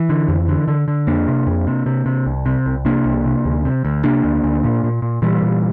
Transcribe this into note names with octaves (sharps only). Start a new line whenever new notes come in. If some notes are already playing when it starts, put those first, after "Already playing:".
Already playing: E3
D3
F2
D3
D3
D3
F2 A#3 D4
C3
F2
C3
C3
C3
C2
C3
C2
C3 A#3 D4
C2
C3
D2
C3
D2
C3 A#3 D4
D2
D2
A#2
A#2
A#2
A#2 E3 G3
A#2